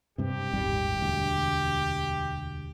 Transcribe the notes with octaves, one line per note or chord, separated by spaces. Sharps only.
G2 C3 G4
D#1 G#1 G3
E1 D2